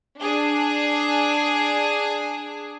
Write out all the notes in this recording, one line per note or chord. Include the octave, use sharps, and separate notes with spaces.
D4 G#4